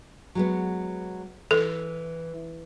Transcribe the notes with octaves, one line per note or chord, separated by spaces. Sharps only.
F#3 G#3 B3
E3 A4